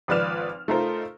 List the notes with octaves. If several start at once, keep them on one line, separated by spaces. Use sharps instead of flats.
G#1 F3 B4 D5 F6 E7
A3 D#4 F4 A#4 C5